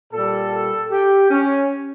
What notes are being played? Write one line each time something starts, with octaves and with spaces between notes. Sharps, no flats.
A#2 G3 A4
G4
C#4